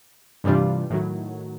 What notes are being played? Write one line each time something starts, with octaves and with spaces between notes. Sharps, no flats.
G2 C3 E3 G3 D4 F4
A2 D#3 F#3